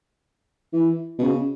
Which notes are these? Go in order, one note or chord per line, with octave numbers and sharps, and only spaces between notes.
E3
B2
C#3